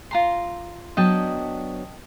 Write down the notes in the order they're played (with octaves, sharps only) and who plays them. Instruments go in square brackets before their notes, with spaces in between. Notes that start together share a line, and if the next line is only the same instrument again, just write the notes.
[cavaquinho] F4 A#5 C6
[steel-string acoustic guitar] F#3 B3 D4 [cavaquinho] D#5 G5 A5